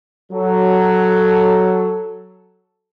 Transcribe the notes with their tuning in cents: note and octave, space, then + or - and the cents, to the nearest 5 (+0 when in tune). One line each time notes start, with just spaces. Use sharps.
F#3 +5 A4 +0